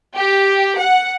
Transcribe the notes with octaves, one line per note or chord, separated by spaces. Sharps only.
G4
F#5